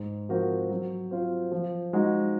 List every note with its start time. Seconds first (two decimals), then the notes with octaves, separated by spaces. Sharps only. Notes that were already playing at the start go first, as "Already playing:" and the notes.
Already playing: G#2
0.29 F3 C4 F#4 A#4
0.70 F#3
1.11 C4 F4 C5
1.52 F3
1.93 G#3 D#4 F#4